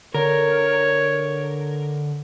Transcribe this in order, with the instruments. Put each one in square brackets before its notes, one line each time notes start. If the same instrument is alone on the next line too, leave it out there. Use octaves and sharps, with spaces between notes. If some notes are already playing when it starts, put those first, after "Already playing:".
[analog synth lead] D3 [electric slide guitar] A#4 [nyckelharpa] C#5